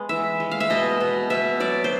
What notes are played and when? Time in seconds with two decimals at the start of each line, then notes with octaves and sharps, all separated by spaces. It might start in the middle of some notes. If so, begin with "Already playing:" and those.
Already playing: G#3 B3
0.09 E3 E5
0.40 G#3
0.51 F5
0.60 E5
0.70 B2 D#5
1.00 B2
1.30 B2 E5
1.60 F#3 D5
1.84 C5